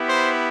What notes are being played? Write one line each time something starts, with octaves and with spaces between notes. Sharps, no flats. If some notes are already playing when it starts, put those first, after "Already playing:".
Already playing: B3 E4 G4
C5